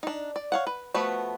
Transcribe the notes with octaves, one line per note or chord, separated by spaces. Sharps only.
D4 D#4
D5
C#5 F5 F#5
B4
F3 A3 B3 F#4 B4